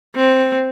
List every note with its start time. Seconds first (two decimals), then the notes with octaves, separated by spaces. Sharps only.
0.16 C4